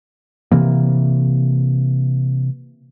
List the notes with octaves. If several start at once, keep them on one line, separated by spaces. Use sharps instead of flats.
C3 E3 A#3